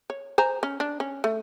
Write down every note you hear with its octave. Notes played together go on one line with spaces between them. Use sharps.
C#5
C5 G#5 A#5
C#4
D4
C#4
A3